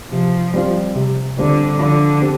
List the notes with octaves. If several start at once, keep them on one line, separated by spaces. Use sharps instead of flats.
C3 F3
G3 C4 F4
C3
D3 G3 C4 F4
D3 F3
C4 G4